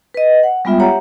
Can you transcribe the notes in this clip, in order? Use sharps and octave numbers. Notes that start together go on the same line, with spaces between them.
B4 D#5
F#5
G3 G#3 B3 F4 E5 G5
G4 C#5 E5 F#5 A#5